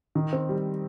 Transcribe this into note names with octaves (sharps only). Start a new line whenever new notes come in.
D#3
C4
G3